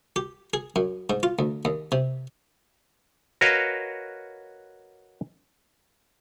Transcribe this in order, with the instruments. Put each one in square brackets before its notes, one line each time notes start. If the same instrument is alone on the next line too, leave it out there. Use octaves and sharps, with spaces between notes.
[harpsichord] G4
G#4
F#2
G#2
F4
D2
D#2
C3
[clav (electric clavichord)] F#4 A#4 B4 C#5 D#5 F5